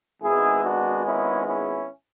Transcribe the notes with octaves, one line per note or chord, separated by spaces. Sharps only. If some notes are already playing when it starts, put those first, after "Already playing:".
G#1 G#2 G#3 B3 E4 G#4
D4 F#4
C#4 E4
C#4 E4